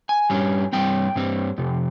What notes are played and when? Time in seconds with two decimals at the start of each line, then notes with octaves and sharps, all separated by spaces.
0.09 G#5
0.30 G2 G3 C#4
0.73 G2 G3 C4 G5
1.16 G2 G3 C4
1.58 F2 C3